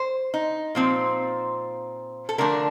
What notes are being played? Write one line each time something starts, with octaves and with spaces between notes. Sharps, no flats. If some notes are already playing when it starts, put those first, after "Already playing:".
Already playing: C5
D#4
A#2 F3 C4
A4
D3 F3 A3 D4 A#4